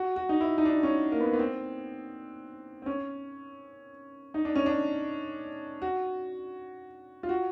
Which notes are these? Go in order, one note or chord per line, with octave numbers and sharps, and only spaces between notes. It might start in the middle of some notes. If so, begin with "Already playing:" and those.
Already playing: F#4
F#4
D#4
E4
D#4
D4
C#4
A#3
B3
B3
C4
C4
C#4
D#4
D4
C#4
D4
F#4
F4
F#4